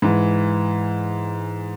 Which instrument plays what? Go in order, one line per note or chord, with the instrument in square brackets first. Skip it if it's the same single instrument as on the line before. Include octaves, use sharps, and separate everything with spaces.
[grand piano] G#2 E3